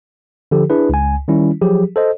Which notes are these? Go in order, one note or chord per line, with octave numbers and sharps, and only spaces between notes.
D3 F3 G4 A4
D4 E4 G#4 B4
C#2 G#5
D#3 G3 C#4 E4
F3 F#3 G4 G#4
A4 C5 D#5